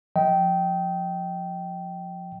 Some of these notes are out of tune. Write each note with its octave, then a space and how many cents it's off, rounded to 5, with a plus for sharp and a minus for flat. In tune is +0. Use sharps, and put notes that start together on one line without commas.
F3 +20 D#5 +30 G5 -15